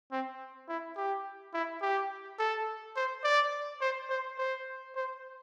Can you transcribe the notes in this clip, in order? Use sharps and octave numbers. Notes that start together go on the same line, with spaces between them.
C4
E4
G4
E4
G4
A4
C5
D5
C5
C5
C5
C5